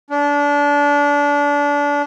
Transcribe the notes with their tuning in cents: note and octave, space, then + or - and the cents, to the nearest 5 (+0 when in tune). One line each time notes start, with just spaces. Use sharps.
D4 -25